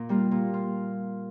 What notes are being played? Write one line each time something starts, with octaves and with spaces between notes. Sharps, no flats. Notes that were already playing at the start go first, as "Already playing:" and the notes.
Already playing: A#2
G3 A#3 F4
A#2
F4